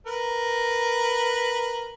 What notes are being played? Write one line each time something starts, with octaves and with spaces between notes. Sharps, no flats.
A#4 B4